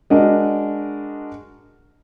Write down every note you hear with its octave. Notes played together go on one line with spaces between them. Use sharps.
G#3 D4 F#4 A#4 D#5